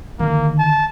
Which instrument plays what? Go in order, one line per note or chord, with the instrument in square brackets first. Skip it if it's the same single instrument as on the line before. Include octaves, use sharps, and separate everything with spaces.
[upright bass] D3 D#3 [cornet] A#3
[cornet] A5